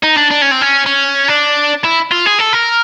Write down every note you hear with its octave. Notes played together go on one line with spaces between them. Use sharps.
D#4
D4
D4
C#4
C4
C#4
C#4
D4
E4
F4
G#4
A4
A#4